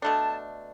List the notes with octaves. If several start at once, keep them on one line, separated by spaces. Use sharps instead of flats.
B2 A3 D4 A5